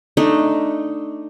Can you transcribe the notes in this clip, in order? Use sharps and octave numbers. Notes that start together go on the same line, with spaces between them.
A3 D4 D#4